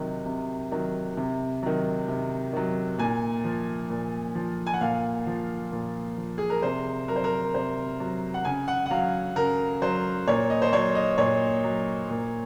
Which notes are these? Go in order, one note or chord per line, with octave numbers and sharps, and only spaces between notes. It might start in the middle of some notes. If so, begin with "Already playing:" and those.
Already playing: C3 D#3 F#3
C3
D#3 F#3
C3
D#3 F#3
C3
D#3 F#3
A#2 G#5
F3
A#2
F3
G#5
F#5
A#2 F5
F3
A#2
F3
G#4
A#4
C3 C5
F#3 A#4
C5
A#4
C3 C5
F#3
F#5
C#3 G#5
F#5
F#5
F#3 F5
C#3 A#4
F#3 C5
A#2 C#5
D#5
C5
F#3 C#5
D#5
A#2 C#5
F#3
A#2